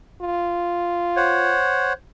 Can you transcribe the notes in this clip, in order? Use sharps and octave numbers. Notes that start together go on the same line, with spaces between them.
F4
C5 C#5 F#5